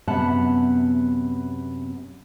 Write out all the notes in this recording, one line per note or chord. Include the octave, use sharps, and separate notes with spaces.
F#2 C3 B3 E5 F#5 A5